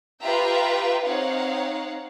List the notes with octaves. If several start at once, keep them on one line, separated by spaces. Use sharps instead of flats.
F4 G4 B4 E5 G5 A#5
C4 D#4 C#5 F5 F#5